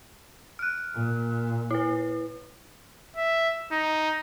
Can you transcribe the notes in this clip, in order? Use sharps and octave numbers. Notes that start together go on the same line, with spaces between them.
F6 F#6
A#2
E4 B4
E5
D#4